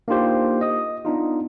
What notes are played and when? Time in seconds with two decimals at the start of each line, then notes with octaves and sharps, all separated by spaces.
0.08 A#3 D4 D#4 F4 G4 C5
0.61 D#5 D#6
1.05 B3 D4 D#4 F4